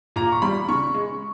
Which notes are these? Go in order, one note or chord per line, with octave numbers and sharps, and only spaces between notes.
A#2 A#5
C#6
G3 B5
C#3 C#6
G#3